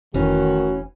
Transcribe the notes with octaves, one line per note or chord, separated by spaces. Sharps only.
F1 D#3 E3 A3 C#4 D#4 F#4